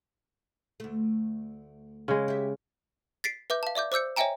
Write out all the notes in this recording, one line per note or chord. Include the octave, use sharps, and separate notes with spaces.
D2 A3
C#3 G#3
G4 E5
A6 B6 C7 D7
B4 E5 D6 G6
F5 A5
D5 E5 D6 G6
C5 D6 E6 G6 C#7
C#5 D#5 E5 G5 G#5 A#5